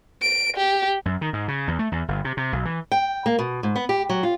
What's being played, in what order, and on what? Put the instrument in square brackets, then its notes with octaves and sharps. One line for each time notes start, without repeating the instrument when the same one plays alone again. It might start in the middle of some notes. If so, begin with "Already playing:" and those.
[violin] D7
G4
[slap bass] F#2
D#3
G#2
C#3
E2
A3
E2
G1
C3
C3
B1
E3
[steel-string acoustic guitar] G5
A#3
B2
G#2
B3
G4
F#3
F4